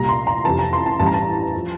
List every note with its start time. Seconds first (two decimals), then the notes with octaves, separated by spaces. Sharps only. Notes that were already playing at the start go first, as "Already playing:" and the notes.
Already playing: C2 A#2 G3 A#5
0.09 C6
0.27 A#5
0.45 F2 C3 E3 A5
0.59 A#5
0.73 C6
0.86 A5
0.99 A1 G2 E3 G3 A5
1.06 A#5
1.14 A5
1.56 F3